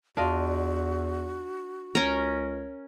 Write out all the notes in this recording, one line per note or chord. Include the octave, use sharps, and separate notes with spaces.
E2 D4 F4 F#4 D#5
C#2 C#4 A#4